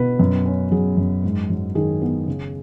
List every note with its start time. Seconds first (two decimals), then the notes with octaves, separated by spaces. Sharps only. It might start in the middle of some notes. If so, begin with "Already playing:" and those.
Already playing: B2 B4
0.19 F#2
0.46 C#4
0.71 F#3 G#4
0.97 F#2
1.24 G#2
1.50 F#3
1.75 D#3 G#4
2.02 B3
2.28 C#3